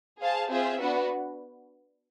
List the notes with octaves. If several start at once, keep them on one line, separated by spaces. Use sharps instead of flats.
G#4 C5 F5 A5
C4 F4 G#4 C5 E5
B3 D4 F#4 B4